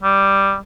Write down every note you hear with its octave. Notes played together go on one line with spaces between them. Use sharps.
G3